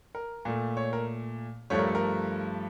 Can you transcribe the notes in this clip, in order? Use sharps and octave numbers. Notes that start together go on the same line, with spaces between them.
A#4
A#2 A3
C#5
A#4
G2 F3 A3 C#5
A#4
A4
A#4